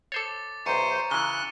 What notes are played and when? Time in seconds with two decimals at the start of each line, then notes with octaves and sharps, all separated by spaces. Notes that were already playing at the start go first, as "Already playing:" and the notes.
0.12 A4 C5 C#5 D6 A6
0.66 B1 E2 C5 A#5 C#6 C#7 D#7
1.11 C#3 E3 F#6 G7